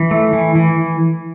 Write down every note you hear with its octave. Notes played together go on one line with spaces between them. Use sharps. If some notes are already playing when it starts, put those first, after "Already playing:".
Already playing: E3
A3
E3
E3